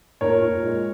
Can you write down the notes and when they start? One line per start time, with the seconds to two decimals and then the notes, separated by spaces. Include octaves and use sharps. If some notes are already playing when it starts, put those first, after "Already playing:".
0.21 A#2 A#4 C#5
0.41 A#2
0.62 G#3